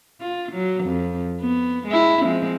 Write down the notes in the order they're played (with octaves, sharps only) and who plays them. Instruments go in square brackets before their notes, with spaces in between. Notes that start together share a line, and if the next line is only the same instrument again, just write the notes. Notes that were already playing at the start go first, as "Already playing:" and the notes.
[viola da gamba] F4
F#3
F2
B3
G#3 E4
F3 G#3 C4